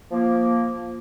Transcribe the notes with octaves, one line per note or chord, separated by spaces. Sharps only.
F3 A#3